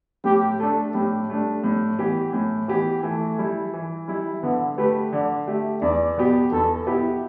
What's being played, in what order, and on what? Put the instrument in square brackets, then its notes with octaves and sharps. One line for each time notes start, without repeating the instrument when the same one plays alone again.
[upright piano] A2 [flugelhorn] G4
[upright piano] A3 D4 [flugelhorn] A4
[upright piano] A2 [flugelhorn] G4
[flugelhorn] G3 [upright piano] A3 D4
[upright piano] A2
E3 B3 G4
A2
E3 B3 G4
[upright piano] E3 [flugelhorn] A3
[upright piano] G3 E4
E3
G3 E4
[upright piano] D3 [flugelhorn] B3
[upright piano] A3 G4 [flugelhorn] B4
[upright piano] D3 [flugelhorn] D5
[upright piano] A3 G4 [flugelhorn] E5
[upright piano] E2 [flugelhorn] D5
[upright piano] B2 B3 G4
[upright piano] E2 [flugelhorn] A4
[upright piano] B2 B3 G4 [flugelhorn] E4